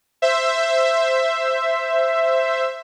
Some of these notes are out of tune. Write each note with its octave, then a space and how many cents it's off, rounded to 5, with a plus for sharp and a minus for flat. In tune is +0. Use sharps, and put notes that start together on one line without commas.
C5 +0 E5 +10